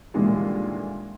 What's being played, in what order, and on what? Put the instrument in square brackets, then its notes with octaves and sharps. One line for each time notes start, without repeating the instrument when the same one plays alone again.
[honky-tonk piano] D#2 A#2 D3 E3 G3 G#3